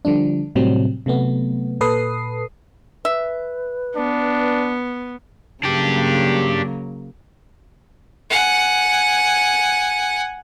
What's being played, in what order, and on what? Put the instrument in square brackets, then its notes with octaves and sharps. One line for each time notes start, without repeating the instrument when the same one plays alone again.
[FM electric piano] D3 F3 G3 D4
A2 C3 F#3 G3 C4
C3 F#3 A3 B3
A#2 A4 B4 D#6 C7
[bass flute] B4 [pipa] E5
[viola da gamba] B3 [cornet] D4
[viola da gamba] C#3 F#3 A#3 [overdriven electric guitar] D4 G4
[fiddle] F#5 G#5